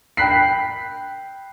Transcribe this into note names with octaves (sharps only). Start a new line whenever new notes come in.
G5 B5 F#6 B6 C7